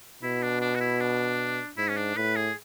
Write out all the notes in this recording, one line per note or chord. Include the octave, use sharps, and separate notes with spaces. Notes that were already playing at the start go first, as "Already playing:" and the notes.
B2 E4
D4
D4
F#4
E4
D4
G#2 E4
C#4
D4
A2 B4
G#4